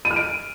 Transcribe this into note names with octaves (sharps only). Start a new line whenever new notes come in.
D#7
F6
D7